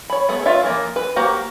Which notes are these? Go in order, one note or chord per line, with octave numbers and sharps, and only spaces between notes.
C#5 B5
A3 B3 G#4
F4 C#5 E5 F5
E3 F3 G#3 A#3
B4
A#3 F#4 G4 C5 A#5